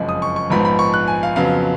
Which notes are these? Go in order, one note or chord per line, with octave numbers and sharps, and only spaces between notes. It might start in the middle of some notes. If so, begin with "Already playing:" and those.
Already playing: F#1 F2 C#3 G#3 C#4
D#6
C#6
C#6
A#1 G#2 F3 B3 B5
B5
C#6
F#6
G#5
F5
F2 C#3 F#3 B3 F5